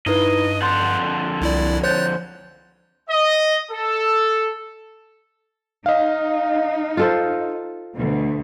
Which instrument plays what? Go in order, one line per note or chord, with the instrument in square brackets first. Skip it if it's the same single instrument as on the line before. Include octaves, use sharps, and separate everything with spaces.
[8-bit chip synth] G2 [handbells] D#4 E4 B4 [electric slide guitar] D#5
[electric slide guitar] F2 D3 F#5 [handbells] C6 G6 A6
[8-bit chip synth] C2 E4 D5
[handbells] C5 G6 [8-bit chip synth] C#5 F#6 A6
[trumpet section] D#5
A4
[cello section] D#4 [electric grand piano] D#5 F5
[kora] F4 A4 C5
[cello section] D2 B2